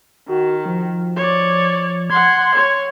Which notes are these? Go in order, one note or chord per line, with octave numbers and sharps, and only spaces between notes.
D#3 F#4
F3
C#5 D5
F#5 C6 G#6
C#5